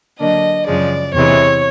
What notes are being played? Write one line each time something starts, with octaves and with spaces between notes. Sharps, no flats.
D3 F#3 A#3 D4 D#5
F#2 C#3 F3 G#3 D5
E2 C3 E3 G#3 C#5